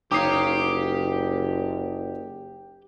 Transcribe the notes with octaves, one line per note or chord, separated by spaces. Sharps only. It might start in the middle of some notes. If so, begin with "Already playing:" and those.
F#1 D#4 G4 C#5 F5 D6 D#6 C7